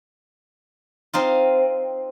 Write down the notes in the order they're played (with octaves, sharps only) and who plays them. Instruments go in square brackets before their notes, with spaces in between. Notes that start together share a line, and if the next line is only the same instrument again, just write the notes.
[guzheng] C4 D#4 F4